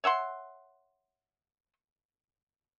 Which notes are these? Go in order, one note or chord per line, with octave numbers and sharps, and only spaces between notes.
C#5 E5 F#5 C6